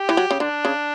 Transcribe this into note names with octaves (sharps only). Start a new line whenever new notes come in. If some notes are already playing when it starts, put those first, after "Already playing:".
Already playing: G4
E3
F#3
C#3
D3 D4
C#3